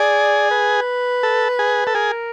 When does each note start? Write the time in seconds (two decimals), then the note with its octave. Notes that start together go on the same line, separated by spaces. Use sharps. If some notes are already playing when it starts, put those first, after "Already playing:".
Already playing: G#4 D5
0.51 B4
1.23 A4
1.59 G#4
1.87 A4
1.95 G#4 A#4